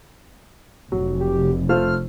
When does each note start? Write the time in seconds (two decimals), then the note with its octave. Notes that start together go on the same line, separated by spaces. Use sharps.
0.92 F1 F#3
1.20 G4
1.69 A3 F4 C5 F6